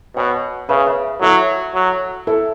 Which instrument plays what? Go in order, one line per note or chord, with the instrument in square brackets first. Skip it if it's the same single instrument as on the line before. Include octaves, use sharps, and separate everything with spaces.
[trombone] B2 [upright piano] C#5 F#5
[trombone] C#3 [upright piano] B4 E5
[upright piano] B4 E5
[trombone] F#3 [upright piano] E4 A4
[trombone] F#3
[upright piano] E4 A4